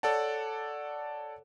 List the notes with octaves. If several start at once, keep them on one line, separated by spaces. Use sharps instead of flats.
A4 C#5 D5 F#5 A5